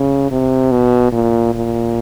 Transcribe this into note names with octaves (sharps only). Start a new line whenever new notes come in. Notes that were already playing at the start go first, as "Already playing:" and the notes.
Already playing: C#3
C3
B2
A#2
A#2